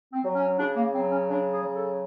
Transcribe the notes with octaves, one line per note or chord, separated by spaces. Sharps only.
C4
F#3
C#4
C#3 D4
A#3
F#3 C4
C#4
C#3 D4
G#4
F#3
A4